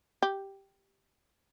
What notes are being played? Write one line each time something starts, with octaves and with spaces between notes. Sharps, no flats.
G4